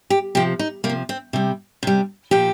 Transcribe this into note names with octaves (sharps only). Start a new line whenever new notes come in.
G4
C3 F3 G4
D#4
C3 A#3
F3
C4
C3 G3
C3 G3
A#2 F3 G4